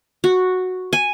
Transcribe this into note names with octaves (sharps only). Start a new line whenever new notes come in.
F#4
G#5